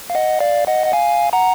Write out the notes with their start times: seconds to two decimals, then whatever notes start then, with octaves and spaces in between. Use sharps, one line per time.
0.10 F5
0.15 D#5 F#5
0.40 D5 F5
0.67 D#5 F#5
0.86 F#5
0.93 F5 G#5
1.33 F#5 A#5